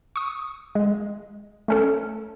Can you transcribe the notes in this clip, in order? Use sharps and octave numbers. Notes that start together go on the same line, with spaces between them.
C#6 D#6
G#3
A3 C#4 A4